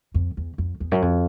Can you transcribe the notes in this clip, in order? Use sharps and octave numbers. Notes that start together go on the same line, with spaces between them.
F2
E2
F2
E2
F#2
F2